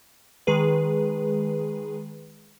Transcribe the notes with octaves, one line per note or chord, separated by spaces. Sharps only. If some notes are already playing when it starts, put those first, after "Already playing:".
D#3 G#3 G#4 B4